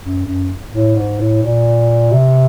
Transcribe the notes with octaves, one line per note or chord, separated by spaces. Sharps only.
F#2
F#2
A2
G#2
A2
A#2
C3